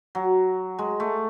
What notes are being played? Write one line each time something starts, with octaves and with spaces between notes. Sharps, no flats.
F#3
G#3
A3